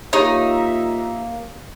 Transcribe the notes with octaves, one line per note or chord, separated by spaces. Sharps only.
A#3 D#4 F4 G4 C#5 E5